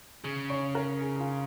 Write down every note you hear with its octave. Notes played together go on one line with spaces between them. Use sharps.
C#3 G#4
C#5
A#4
G#4
G#4
F4